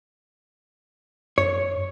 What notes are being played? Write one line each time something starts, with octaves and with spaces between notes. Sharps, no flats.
F#2 C#5